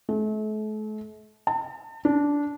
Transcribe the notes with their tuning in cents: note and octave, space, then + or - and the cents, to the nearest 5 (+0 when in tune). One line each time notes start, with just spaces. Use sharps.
A3 -40
A5 +40
D4 -15